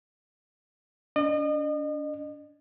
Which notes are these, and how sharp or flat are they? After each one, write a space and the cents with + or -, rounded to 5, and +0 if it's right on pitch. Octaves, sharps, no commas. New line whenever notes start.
D4 -35 D#5 -40